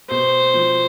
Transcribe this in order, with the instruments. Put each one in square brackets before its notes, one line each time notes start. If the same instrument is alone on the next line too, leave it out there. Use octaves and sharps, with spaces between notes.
[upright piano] B2 [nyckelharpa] C5
[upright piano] F3